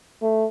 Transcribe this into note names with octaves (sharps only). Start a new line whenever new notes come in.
A3